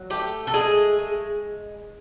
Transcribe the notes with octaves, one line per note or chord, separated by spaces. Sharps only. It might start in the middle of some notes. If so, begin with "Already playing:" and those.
Already playing: F#3
A3 G4
A4
G#3 G#4
G#3